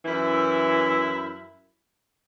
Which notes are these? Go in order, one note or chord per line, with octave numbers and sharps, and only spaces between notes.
F#2 E3 E4